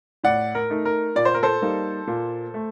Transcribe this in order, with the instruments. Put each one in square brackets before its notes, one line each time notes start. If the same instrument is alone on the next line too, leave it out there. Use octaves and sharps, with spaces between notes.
[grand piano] A2 D5 F#5
A#4
A3 D#4
A#4
A#2 D5
C5
A#4
A4 C5
G3 A#3 D#4
A#2
A3